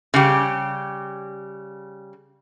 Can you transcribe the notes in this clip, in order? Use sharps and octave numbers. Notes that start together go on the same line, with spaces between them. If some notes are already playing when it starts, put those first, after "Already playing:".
C#3 G3 G4